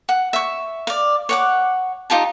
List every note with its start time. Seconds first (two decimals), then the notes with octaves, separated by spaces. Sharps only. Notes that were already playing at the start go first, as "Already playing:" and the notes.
0.09 F#5
0.33 E5 C#6
0.87 D5 F5
1.29 C#5 F#5 D6
2.10 D#4 F4 G4 A5